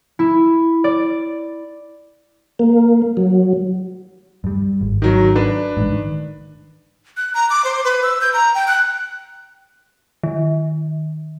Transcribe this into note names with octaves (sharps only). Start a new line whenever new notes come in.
E4
D5
A#3
F#3
G2 G3
G#1
D#3 F#3
D4 B4
A1 G#2
D#3
F#6
A#5
D6
C5
B4
E6
G6
A#5
G5
F#6
D#3